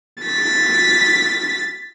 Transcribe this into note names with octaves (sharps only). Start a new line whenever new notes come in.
A6 B6